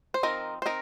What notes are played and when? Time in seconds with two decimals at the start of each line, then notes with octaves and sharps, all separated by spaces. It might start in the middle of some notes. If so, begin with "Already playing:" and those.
0.14 C5
0.23 F3 C4 D#4 A#4 D#5
0.62 C5
0.66 C4 D#4 A#4 D#5